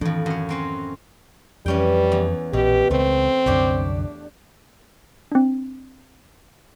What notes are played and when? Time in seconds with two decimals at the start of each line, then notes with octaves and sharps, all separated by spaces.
0.01 F2 A2 D#3 E3 D4
0.26 F#2 C#5
0.49 F#3 C4 C#4
1.66 F2 E3 G3 C#4 G5
2.12 E2
2.53 A#1 B2 G4
2.91 C#2 A3 C4
3.46 C2 F#2 D3 D4 G4 C#5
5.32 C4 D4